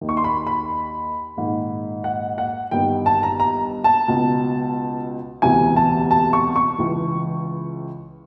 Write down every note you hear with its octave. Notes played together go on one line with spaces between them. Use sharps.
D#2 D#3
C#6
C6
B5
B5
A#1 G#2 D#3
F#5
F#5
G1 G2 D#3 G5
A5
A#5
A#5
A5
C#2 B2
E1 D2 C3 E3 G#5
A5
A5
C#6
C#6
C#2 C#3 E3